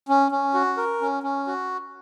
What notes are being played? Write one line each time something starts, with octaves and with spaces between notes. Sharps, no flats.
C#4
C#4
F#4
A#4
C#4
C#4
F#4